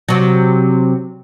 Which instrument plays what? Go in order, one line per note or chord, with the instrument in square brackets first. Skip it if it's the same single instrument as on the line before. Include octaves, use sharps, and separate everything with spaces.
[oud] C3 F#3